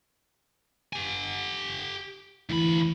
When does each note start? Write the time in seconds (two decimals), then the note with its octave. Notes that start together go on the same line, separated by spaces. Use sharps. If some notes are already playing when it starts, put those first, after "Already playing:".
0.93 G4 G#5
2.50 D2 E3 B5